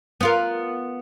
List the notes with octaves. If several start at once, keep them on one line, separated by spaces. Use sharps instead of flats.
B3 F4 A#4